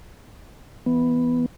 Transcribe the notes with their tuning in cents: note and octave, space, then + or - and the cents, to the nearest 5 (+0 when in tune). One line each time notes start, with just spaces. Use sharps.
E3 +0 B3 +0